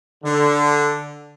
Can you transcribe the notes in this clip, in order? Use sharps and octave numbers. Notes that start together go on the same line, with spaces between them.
D3